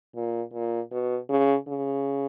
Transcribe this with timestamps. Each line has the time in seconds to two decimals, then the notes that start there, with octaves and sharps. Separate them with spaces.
0.15 A#2
0.54 A#2
0.92 B2
1.29 C#3
1.68 C#3